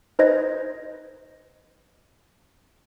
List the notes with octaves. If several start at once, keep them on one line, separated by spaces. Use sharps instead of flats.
D#4 B4 C5 D#5 G#6 A#6